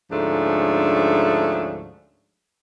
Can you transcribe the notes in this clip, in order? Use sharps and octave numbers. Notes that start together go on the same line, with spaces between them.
D2 G#2 F3 A3 C#4 D4